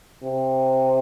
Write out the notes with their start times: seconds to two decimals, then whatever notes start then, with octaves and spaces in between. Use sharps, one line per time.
0.24 C3